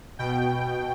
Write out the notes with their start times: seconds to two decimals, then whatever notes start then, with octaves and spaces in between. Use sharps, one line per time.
0.19 B2 G5